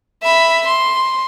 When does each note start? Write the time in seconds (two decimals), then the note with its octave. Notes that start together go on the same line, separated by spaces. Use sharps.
0.23 E5 B5
0.67 C6